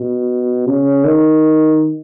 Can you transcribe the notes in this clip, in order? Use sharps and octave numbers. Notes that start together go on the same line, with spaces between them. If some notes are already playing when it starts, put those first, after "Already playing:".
Already playing: B2
C#3
D#3